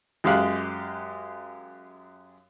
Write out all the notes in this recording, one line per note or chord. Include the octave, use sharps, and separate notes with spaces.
F#2 G#3 G4 F5 F#6